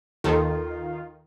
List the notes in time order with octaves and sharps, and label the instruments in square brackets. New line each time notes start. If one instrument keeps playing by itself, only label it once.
[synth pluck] D#2 A4 [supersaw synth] D#3 [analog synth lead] F4